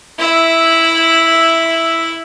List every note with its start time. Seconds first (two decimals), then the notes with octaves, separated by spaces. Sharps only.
0.19 E4 E5